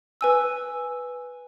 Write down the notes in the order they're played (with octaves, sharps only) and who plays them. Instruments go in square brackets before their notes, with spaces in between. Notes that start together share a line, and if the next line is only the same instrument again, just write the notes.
[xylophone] B4 G#5 E6